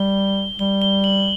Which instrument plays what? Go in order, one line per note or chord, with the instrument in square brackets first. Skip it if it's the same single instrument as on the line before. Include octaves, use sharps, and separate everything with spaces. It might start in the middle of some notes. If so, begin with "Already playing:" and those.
Already playing: [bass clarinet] G3 [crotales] G7
[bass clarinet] G3 [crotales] G7
[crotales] G7
F#7